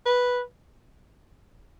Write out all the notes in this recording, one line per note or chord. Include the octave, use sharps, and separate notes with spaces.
B4